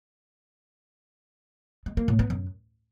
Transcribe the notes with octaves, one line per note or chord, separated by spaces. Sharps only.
G#3
A#3
A2
B3
F#2